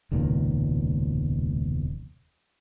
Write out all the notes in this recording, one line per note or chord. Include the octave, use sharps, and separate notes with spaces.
E1 C#2 A#2 D#3